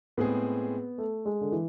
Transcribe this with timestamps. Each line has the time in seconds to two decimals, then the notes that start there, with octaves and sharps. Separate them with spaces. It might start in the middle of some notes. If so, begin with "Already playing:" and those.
0.17 A2 G#3 B3 C4 G#4
0.98 A3
1.26 G#3
1.41 D3
1.52 E3